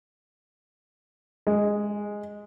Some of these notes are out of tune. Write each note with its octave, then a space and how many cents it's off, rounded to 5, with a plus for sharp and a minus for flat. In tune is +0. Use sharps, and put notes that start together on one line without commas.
G#3 -5